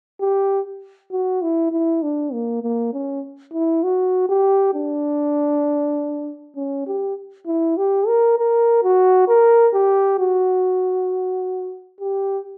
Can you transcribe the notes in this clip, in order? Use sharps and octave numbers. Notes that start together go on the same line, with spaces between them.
G4
F#4
E4
E4
D4
A#3
A#3
C#4
E4
F#4
G4
D4
C#4
G4
E4
G4
A#4
A#4
F#4
A#4
G4
F#4
G4